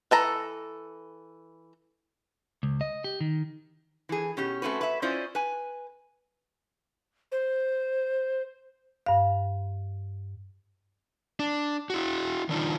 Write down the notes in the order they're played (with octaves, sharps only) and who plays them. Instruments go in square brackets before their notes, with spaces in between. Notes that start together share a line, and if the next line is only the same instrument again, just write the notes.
[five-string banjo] E3 A4 A#5
[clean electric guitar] C#2
D#5
G4
D#3
[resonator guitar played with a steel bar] E3 G#4
B2 C#4 G4
A3 C4 C#4 F#4 B4
B4 E5
C#4 E4 F4 C5 D5 D#5
B4 G#5
[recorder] C5
[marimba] G2 F5
[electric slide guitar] D4
E4 F#4
D#3 D4 D#4 F4